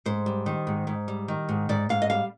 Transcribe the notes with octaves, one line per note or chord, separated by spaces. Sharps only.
G#2 C5
G3
D#3
G#2
G#2
G3
D#3
G#2
G#2 D5
G#2 F5
D#5
G3 F5